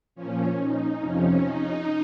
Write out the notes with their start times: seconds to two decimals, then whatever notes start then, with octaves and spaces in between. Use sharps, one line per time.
0.15 A#2 F3 C#4
0.57 D#4
0.99 F2 C3 F3 C#4
1.42 D#4